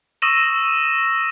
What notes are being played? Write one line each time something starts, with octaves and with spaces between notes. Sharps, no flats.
C#6 D#6 E6 A#6 D#7 E7